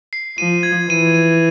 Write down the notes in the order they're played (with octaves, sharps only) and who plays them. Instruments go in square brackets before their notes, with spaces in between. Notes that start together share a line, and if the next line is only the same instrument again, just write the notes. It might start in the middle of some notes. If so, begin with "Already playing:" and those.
[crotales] C7
[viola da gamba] F3 [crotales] D#7
[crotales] G#6
[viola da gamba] E3 [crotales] D#7
[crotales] D#7